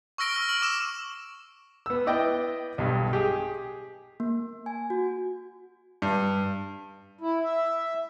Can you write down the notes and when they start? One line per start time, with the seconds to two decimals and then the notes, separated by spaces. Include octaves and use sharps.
0.18 C#6 E6 F6 A#6 D7 G7
0.36 F6
0.49 F#7
0.62 D6 E6 E7
1.86 B3 E6
2.06 B3 E4 D5 D#5 G5
2.78 B1 G2
3.13 G4 G#4
4.20 A#3
4.66 G#5
4.90 F#4
6.02 G2
7.21 E4
7.43 E5